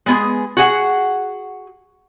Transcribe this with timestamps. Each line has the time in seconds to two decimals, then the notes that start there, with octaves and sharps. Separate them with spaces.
0.06 G#3 B3 G#4
0.57 F#4 G#4 F#5